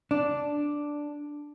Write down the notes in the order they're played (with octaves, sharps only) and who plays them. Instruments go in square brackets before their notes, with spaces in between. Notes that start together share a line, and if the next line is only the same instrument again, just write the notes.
[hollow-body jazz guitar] D4